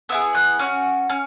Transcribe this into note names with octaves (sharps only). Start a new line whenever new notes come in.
B3 E4 G#4 E6
F#6
C#4 F#4
C#4